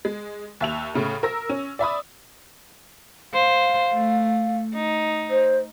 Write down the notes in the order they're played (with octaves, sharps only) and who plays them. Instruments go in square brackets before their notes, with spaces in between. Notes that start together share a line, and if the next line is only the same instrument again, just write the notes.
[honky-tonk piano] G#3
D#2 E5 F7
A2 C#3 A3
A#4 E6 A#6
C#4
D5 E5 B5 D#6
[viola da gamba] C5 [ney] F5
[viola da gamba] A3
D#4
[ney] C5